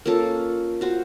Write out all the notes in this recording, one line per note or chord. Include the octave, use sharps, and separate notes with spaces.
A#3 C#4 F4 A4
F4 F#4 C5